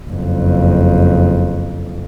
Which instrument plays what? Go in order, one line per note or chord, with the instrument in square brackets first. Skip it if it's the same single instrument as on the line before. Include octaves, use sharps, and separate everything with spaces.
[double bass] F#1 F2